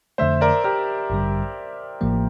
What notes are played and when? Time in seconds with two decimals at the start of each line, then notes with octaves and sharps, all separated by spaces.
0.18 F2 D3 A3 C5 E5
0.41 A#4 D5
0.64 G4 A#4
1.10 A1 G2 D3 G3
2.01 A1 A2 F3 A#3